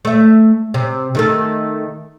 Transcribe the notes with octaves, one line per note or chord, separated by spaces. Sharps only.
A3 E5
C3
D#3 A3 A4